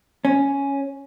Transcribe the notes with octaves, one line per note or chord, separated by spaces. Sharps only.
C#4